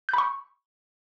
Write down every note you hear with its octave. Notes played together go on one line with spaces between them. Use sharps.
B5 C#6 G6